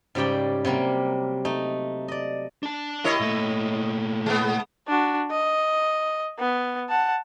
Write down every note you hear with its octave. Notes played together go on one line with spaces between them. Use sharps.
G#2 C#3 G3 G4 D5 G5
C3 F#3 G3 A#3
A3 D#4
D5 D#5
D4 A5
E4 G4 A#4 C#5 D#5
A#2 A3
G#3 B3
D4 F#4
D#5
B3
F#5 A5